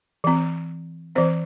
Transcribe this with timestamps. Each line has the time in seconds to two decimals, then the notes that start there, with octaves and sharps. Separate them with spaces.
0.24 E3 C4
1.15 E3 C4 C5